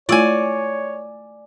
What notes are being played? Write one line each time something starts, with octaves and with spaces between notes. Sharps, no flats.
A3 E4 F4 C#5 D5 G#5